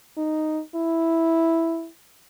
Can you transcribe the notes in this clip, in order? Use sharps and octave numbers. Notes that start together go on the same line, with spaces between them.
D#4
E4